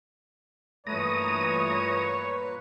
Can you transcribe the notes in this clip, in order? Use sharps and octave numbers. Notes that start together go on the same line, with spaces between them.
G2 A#2 E3 A3 B4 C#5 A#5 D#6